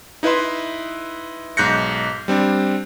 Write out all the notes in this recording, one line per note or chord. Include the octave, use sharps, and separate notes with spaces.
D#4 E4 B4 E5 C6
B1 G#2 F#6 G6 A#6 C#7
G3 C4 D4